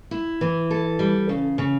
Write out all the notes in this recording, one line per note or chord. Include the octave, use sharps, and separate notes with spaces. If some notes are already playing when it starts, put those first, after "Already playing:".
E4
E3
A4
G3
C#3
C#3